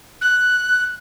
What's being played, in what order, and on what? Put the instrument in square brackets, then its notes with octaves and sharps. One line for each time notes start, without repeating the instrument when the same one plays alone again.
[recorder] F#6